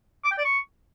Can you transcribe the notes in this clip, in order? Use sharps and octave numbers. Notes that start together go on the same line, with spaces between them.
D6
G5
D5
C#6